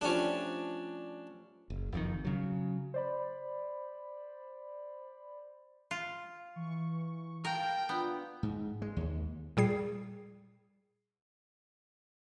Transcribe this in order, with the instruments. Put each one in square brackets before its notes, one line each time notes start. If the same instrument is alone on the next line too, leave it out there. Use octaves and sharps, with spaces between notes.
[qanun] F3 G3 A3 [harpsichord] C#4 D4
[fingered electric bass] F#1
F#1 F2 B2 D#3
C#3 F#3
[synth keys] C5 D5 B5
[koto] F4
[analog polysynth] E3 C#6
[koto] A#4 [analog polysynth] F5 A5 [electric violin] G5
[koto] B3 [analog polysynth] D4 F4
[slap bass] G#2
G#3
D#2
[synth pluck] A#2 G3 G#4 C7